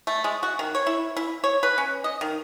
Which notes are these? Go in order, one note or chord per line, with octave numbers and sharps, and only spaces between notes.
A3
G#3
F#4
D#3
C#5
E4
E4
C#5
B4
C#4
D#5
D#3